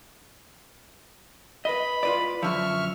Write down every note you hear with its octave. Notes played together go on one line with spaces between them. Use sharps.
B4 D#5 B5
F4 B4 D5
F#2 D3 F3 E5 C#6 F6